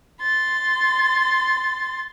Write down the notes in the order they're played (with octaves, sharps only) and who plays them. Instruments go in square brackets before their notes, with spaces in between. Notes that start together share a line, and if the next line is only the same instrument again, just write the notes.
[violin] C6 A6